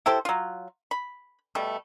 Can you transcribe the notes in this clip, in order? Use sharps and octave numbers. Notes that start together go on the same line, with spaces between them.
E4 G4 A4 C5
F#3 F4
B5
B2 G3 A3